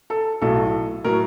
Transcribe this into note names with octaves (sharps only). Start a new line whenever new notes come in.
A4
B1 A2 F#3 A4
A2 F#3 A#4